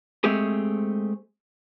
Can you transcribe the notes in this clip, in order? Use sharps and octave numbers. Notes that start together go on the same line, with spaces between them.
G#3 A3 C4 G4 G#4